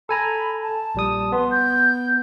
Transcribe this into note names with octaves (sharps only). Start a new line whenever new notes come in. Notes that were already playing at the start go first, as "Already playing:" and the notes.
A4 G#5 A#5 B5
A5
A#1 G3 D#6
B3 C6
G6